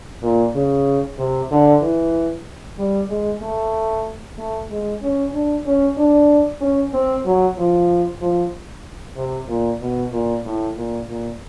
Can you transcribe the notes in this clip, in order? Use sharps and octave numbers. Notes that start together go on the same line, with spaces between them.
A#2
C#3
C3
D3
E3
G3
G#3
A3
A3
G#3
C#4
D4
C#4
D4
C#4
C4
F#3
F3
F3
C3
A#2
B2
A#2
A2
A#2
A#2